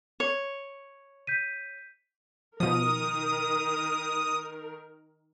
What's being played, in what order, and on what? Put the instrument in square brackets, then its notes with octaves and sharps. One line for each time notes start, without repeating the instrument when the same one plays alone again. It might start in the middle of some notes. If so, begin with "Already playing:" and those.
[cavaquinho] C#5
[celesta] G6 B6 D#7
[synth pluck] B2 F3 [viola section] D#3 A#4 [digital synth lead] D#6